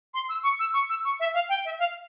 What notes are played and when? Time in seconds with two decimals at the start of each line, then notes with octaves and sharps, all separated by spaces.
0.14 C6
0.29 E6
0.43 C#6
0.60 E6
0.74 C#6
0.90 E6
1.05 C#6
1.20 E5
1.34 F5
1.49 G5
1.65 E5
1.79 F5